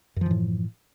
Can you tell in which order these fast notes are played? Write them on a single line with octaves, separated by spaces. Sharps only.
F#2 F3 E3 A2